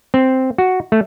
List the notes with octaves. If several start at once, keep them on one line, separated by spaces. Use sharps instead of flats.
C4
F#4
A3